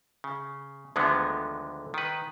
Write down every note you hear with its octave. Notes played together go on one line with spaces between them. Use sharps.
C#3
D2 D3 D#3 F3 G#3 B3
D#3 B4